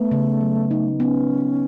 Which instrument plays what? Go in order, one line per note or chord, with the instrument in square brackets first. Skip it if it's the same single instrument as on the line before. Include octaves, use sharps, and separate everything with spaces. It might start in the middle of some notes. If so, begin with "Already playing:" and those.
Already playing: [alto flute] A3 [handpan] B3
[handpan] C#3
F#3
D#4
[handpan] B3 [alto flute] C#4